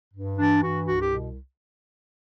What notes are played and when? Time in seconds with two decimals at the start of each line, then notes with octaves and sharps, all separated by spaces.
0.14 G2
0.38 E3 D4
0.62 G2 F#4
0.85 C2 F#4
1.01 G4
1.09 B2